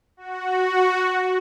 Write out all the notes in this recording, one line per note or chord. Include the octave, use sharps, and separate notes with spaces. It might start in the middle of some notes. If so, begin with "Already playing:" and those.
F#4